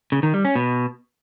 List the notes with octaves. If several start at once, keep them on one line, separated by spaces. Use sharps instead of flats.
C#3
D#3
G3
C#4
B2